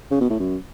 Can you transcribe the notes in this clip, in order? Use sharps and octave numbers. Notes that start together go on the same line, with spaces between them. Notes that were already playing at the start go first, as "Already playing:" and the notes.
C#3
B2
A2
F#2